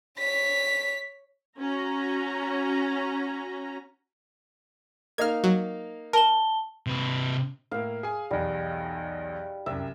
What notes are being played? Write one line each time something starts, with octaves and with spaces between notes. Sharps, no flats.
C#5 B6
C#4 F#4 A#5
A#3 D#4 F5 F6 G#6
F#3
A#4 A5 E7 G7
C3 B4
A2 A#3 F5
G#4 G#5
B1 E2 G3
C2 F#2 E5